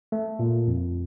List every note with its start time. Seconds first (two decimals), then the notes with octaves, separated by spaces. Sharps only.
0.12 A3
0.39 A#2
0.67 F2